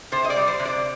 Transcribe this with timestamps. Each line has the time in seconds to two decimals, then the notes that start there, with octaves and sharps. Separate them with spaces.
0.12 C3 C5
0.24 D#5
0.30 D5
0.36 G3
0.48 C5
0.59 C3
0.65 D5